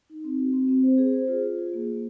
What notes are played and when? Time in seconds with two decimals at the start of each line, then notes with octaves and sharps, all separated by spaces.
0.10 D#4
0.24 C4
0.38 F#4
0.54 C4
0.68 C4
0.83 C5
0.98 G#4
1.13 C5
1.28 F4
1.43 G#4
1.58 F4
1.73 A#3
1.88 A#3